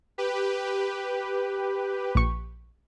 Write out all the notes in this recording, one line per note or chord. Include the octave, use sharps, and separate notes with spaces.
G4 B4
A#1 C#6